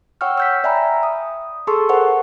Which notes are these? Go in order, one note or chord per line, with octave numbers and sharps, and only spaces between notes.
C#5 F#5 G5 C#6 E6 F6
E6 G6 B6
D5 E5 G5 G#5 A#5 B5
D#6
G#4 A4 A5 C6 C#6 E6
A#4 C5 F#5 C#6